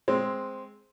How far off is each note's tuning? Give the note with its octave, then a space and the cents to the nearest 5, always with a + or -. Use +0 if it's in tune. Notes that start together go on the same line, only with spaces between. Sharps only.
G#3 +0 C4 +0